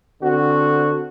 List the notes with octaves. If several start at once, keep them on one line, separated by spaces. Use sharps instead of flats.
D3 C4 F#4